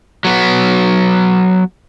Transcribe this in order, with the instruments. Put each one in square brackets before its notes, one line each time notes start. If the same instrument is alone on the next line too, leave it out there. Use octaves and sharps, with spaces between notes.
[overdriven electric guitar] F#3 B3